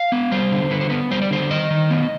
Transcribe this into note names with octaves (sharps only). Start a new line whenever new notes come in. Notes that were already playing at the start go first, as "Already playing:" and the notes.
Already playing: F5
B3
G3 C5
D3
D3 B4
C5
B3 B4
G3 C5
D5
D3 C5
D#3 D#5
D#3
B3